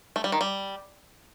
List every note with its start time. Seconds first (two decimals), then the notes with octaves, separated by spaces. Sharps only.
0.16 A3
0.24 G3
0.32 D#3
0.41 G3